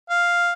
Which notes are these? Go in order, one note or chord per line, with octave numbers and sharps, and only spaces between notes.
F5